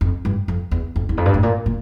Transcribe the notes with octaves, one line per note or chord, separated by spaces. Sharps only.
F2
G2
F2
E2
F2
E2
F2
G2
A2
A#2
A#2